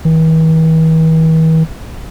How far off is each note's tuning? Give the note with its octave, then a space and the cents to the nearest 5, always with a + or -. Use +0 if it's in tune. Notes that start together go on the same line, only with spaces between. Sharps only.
E3 -45